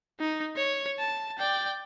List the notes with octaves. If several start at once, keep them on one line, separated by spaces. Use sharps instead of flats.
D#4
C#5
A5
D5 G5